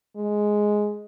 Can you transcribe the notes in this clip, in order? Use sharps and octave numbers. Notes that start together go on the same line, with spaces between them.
G#3